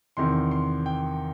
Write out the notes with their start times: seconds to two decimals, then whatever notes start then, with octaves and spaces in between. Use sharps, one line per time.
0.17 E2 C3 D#3 C6
0.51 C6
0.86 G5